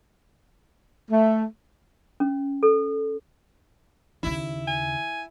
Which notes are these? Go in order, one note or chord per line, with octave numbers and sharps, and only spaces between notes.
A3
C#4
A4
D#2 C#3 E4
G#5